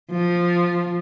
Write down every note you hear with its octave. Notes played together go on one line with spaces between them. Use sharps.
F3